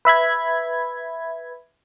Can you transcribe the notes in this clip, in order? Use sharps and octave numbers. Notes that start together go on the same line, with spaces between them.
B4 E5 B5 G#6